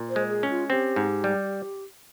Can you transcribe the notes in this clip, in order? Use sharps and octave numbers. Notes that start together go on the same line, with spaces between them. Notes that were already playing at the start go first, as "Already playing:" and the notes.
Already playing: A#2
C5
G#3
G#4
C#4
F4
C4 G4
G#2
G3